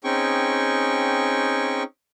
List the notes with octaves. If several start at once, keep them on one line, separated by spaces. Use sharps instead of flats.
C4 C#4 D#4 G#4 G5 C#6